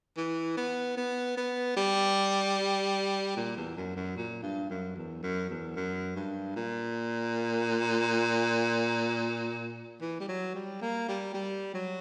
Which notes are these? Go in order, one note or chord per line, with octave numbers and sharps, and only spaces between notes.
E3
B3
B3
B3
G3
A#2
E2
F#2
F#2
A#2
G2
F#2
E2
F#2
E2
F#2
G2
A#2
E3
G3
F#3
G3
A#3
G3
G3
F#3